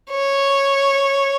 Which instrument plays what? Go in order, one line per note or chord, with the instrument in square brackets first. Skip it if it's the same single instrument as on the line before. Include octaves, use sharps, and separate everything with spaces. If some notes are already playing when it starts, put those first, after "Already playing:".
[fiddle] C#5